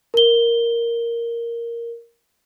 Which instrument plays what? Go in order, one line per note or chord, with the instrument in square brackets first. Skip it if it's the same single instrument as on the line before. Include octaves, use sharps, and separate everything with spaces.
[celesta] A#4 G7